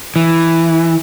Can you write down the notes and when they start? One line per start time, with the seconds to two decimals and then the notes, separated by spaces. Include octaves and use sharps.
0.16 E3